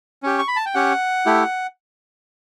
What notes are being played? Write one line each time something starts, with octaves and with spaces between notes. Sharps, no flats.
C#4 G4
C#6
B5
A5
G5
C#4 G4 F#5
A3 E4 G4